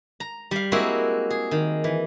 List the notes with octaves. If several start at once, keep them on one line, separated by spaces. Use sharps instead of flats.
A#5
G3 F5
G#3 A#3 C4 E4 F#4
G#4
D#3
E3